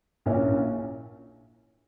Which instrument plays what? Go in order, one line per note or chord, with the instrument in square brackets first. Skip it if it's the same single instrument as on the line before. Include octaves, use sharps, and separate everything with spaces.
[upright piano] A#1 A#2 A#3 C#4 E4